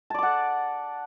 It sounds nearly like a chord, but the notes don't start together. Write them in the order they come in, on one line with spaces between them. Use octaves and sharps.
A5 D5 D6 F#5